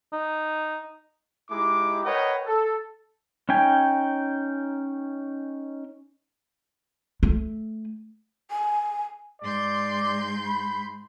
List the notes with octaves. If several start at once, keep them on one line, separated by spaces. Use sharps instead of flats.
D#4
G#3 D#4 E4 G4 D6
A#4 B4 C#5 D#5 F#5 G5
A4
C#4 D#4 G5 G#5
A3
G#5
G#2 D5 C6 G6
B5